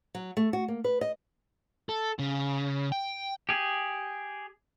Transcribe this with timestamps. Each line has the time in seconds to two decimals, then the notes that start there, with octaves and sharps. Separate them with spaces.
0.15 F#3
0.37 A3
0.53 F#4
0.68 A#3
0.84 B4
1.01 D#5
1.89 A4
2.19 C#3
2.92 G5
3.49 G4 G#4